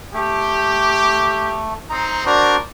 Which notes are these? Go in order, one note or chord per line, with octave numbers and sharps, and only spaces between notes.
A3 G4
C4 D#4 A#5
D4 F#4 A#4 C5 D5